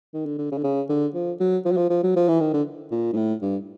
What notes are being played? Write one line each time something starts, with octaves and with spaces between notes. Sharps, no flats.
D#3
D3
D3
C#3
D3
C#3
D3
F3
F#3
F3
F#3
F3
F3
F#3
F3
E3
D#3
D3
A#2
G#2
A2
G2